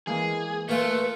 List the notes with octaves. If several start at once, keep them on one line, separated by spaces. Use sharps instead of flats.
E3 G#3 A#3 G#4
A#2 A3 F4 B4